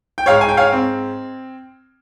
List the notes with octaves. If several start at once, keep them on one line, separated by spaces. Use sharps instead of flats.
G5
G#2 C#5 F5
G#5
G5
C#5 F5
C4